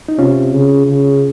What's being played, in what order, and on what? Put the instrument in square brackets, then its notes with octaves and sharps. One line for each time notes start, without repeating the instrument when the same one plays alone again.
[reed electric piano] D#4
[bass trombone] C3 [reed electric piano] C#4 F4
[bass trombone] C#3
C#3